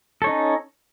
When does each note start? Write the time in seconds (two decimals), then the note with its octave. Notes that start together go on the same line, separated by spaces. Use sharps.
0.22 A4
0.24 C#5
0.27 D#4
0.29 C#4